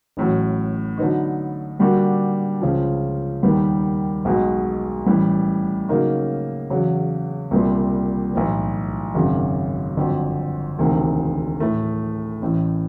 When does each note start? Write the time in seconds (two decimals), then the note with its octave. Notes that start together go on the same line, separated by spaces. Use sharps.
0.17 A1 A2 F#3
0.98 D3 F#3 B3 D#4
1.79 D3 G3 A#3 D4 F#4
2.62 C#2 C#3 F3
3.43 D#2 D#3 G3 B3
4.25 B1 B2 G#3
5.06 A1 A2 E3 G3
5.89 C#3 F#3 A#3 D#4
6.70 E2 C#3 F#3
7.51 C2 A#2 G3 B3
8.33 B1 A2 E3
9.15 G#1 F#2 C#3
9.96 G1 F2 D3 F#3
10.79 E1 D2 C3 D#3
11.60 A2 E3 A3
12.42 A1 A2 E3